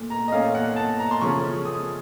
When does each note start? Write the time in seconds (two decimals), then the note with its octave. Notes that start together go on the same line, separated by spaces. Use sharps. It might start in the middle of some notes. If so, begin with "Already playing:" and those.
Already playing: A#2 A3
0.10 A#5
0.28 D#5
0.32 A#2 A3 C#4 F5
0.55 F#5
0.76 A5
0.99 A#5
1.11 C6
1.21 C#3 F3 A3 C#4 C#6
1.65 D#6